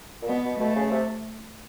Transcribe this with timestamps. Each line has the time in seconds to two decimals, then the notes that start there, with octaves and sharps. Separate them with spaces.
0.22 A#2
0.28 B2 B3
0.44 B2
0.60 B2 A3
0.75 C#3
0.91 C3